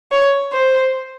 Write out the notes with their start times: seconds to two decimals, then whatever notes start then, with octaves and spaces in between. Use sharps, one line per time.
0.11 C#5
0.53 C5